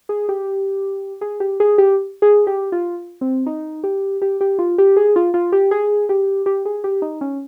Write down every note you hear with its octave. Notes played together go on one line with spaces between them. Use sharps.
G#4
G4
G#4
G4
G#4
G4
G#4
G4
F4
C4
D#4
G4
G4
G4
F4
G4
G#4
F4
F4
G4
G#4
G4
G4
G#4
G4
D#4
C#4